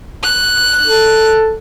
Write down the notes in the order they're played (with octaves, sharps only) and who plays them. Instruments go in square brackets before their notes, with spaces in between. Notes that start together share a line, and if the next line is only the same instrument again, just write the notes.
[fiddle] F#6
[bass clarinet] A4